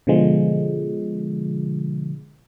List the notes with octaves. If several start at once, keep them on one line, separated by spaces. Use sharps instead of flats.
B2 D3 F3 G#3